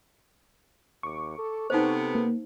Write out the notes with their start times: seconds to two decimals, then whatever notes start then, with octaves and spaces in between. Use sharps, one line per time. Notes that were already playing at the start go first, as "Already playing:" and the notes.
1.03 D#2 C#6 D6
1.38 A4
1.70 C3 B3 D#4 A4 C5
2.15 A#3